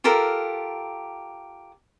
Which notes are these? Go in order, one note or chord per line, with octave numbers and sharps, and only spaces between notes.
F4 G4 A4 A#4